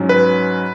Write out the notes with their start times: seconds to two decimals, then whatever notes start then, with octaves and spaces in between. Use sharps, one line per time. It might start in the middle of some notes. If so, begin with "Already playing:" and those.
Already playing: G#2 F#3 C#4
0.09 B4